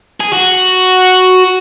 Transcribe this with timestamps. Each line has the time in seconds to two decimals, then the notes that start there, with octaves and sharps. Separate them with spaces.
0.20 G#4
0.33 F#4